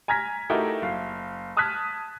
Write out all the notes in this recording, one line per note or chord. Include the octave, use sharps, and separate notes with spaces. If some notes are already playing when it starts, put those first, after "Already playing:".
G#5 A#5 F6 G#6 A#6 B6
A3 D#4 E4 F#4 G4 A#4
F#1 F5
A5 D#6 F6 F#6 G#6 B6